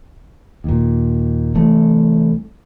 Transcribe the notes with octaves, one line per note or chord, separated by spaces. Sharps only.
D#2 A#2
C2 C3 E3 A3